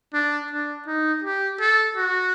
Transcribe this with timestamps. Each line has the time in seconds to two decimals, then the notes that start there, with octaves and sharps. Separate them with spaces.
0.14 D4
0.51 D4
0.87 D#4
1.24 G4
1.61 A4
1.96 F#4